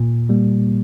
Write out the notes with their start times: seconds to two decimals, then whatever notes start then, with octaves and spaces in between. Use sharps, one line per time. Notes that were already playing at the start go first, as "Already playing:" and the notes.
Already playing: A#2
0.29 G3 A#3